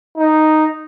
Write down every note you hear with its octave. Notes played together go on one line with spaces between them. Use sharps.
D#4